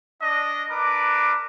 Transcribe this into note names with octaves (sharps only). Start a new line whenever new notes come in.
D4 D#5
D4 A#4 B4 D6